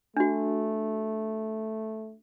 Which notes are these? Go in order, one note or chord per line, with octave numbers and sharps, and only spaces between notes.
A3 D4 F#4